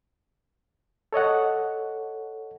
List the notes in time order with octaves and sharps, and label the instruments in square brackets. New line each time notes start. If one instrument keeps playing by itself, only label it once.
[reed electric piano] A4 C#5 D#5 F#5